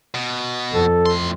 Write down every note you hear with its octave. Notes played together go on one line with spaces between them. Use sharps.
B2
F2 A4
A2 C6